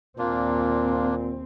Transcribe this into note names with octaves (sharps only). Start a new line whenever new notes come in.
D#2 A#2 A#3 C4 D4 F4